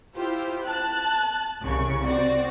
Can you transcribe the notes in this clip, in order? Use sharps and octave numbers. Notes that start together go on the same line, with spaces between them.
E4 F4 G4 C5
A5 F#6
C2 C#3 C#6
C4 F#4 D5